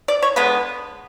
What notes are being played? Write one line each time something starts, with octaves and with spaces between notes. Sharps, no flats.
D5
C#5
D3 G#3 B3 B4